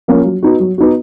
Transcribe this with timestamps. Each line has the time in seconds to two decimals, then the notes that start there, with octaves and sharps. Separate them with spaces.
0.08 F3 A#3 C#4
0.25 F#3
0.43 B3 D#4 F#4
0.60 F#3
0.78 B3 D#4 F#4